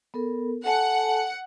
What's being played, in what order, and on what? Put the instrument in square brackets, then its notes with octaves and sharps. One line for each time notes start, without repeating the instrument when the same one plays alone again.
[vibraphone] B3 A4 A#4
[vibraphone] A4 G#5 A5 [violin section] F#5